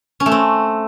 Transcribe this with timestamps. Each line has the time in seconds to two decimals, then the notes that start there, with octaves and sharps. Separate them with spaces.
0.20 C#4
0.26 A3
0.32 C4